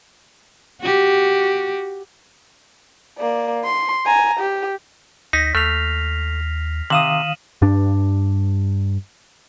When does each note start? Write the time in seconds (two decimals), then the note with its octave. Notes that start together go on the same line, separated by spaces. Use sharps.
0.81 F#4 G4
3.19 A#3 D5
3.64 C6
4.06 G#5 A#5
4.39 G4
5.33 D2 D#4 A#6 B6
5.55 D#2 A3 F6 C7 F7
6.90 C3 D#3 F5 D#6 D#7 E7 F#7
7.62 G2 D4